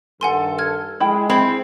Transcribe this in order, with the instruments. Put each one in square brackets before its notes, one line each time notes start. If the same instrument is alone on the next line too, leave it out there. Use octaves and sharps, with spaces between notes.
[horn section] G2 D#3 A4 [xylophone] F#5 G#5 C6
[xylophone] F6 G#6
[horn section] G#3 [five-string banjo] E4 G5
[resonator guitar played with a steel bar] C4 [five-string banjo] E4 B5